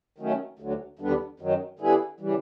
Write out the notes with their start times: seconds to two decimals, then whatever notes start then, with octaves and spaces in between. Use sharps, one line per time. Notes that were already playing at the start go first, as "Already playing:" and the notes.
0.18 D#3 F#3 A3 C#4
0.59 D2 D3 F#3
0.99 D#2 D3 G3 B3 D4
1.40 F#2 D#3 F#3
1.79 D3 G3 B3 E4 G#4
2.20 C#3 E3 G3